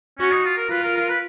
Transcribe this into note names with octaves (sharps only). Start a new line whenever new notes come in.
C#4 F#4
D#4
F4
A#4
F4 B4
A#4
A#4
B4